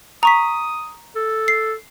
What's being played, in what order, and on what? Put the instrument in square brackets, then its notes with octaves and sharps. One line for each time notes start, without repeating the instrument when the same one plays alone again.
[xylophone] A#5 C#6 B6 [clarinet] D#6
[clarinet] A4
[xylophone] C7